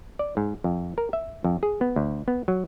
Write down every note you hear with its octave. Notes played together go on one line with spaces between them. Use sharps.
D5
G#2
F2
A#4
E5
F2
G#4
B3
D2
B3
F#3